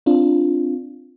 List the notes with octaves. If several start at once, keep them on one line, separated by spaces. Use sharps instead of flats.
C4 D4 F4